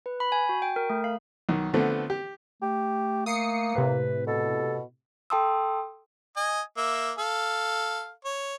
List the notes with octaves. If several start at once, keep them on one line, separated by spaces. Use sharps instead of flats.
B4
B5
G#5
F#4
G5
A#4
A3
F5
B1 D#3
D3 F3 A3 B3 C4
G4
A3 G4
A#3 D#6 C7 C#7
A2 C3 B4
B2 A4
A4 G5 A5 C6 D#6 E6
D#5 G#5
A#3 E5
A4 F5
C#5